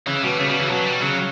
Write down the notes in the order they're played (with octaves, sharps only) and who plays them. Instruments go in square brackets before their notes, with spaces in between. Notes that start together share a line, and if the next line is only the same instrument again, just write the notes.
[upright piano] C#3 [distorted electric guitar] E3
[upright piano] B2 [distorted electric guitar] G3
[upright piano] C#3 [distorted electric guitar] A3
[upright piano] B2 [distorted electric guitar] G3
[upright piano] C#3 [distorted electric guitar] E3
[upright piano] B2 [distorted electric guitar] F#3
[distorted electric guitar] G3
[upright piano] C#3 [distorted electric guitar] F#3